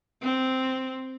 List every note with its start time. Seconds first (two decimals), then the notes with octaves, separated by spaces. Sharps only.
0.22 C4